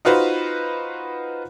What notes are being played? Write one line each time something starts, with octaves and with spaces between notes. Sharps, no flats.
D#4 F4 F#4 B4 C5